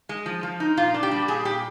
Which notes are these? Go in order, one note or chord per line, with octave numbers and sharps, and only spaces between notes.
G#3
F3
F3
D#4
A#2 F4
D4
G4
G3
A#2 G#4
A#2 G4